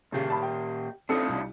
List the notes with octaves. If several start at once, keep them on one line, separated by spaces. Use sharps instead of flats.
A#2 C#3 G4
A5 B5
G5
C4 D4 D#4 F4 A4 C#7
C2